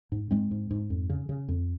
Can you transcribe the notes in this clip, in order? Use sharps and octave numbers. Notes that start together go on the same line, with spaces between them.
G#2
G#2 G#3 C4
G#2
G#2
F2
C#3
C#3
F2